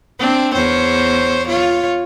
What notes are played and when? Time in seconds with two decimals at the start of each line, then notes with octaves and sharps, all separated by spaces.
0.19 C4 D4
0.54 E2 C5 C#5
1.47 F4 C#5